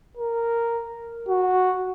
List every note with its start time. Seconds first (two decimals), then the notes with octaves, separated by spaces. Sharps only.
0.17 A#4
1.29 F#4